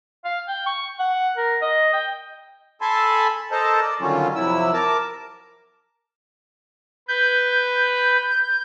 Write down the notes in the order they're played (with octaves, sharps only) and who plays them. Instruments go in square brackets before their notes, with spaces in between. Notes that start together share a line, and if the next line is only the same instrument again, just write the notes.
[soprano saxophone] F5
G5
C#6
F#5
A#4
D#5
G5
[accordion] A4 G#5 A5 B5 C6
A4 A#4 C5 D#5 A5
D5
D3 D#3 F#3 G3 C#4 F4
F2 C3 F#3 E4 E6
A#4 A5 D6
[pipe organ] B4 [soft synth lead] G6